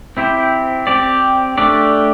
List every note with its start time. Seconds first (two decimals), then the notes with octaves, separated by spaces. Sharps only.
0.17 C4 E4 G4 C5
0.87 C4 G4 D5
1.58 A3 D4 G4 D5